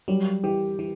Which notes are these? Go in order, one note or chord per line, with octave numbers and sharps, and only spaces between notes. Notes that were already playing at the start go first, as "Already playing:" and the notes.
F#3 G3
E3 G4
E3 G4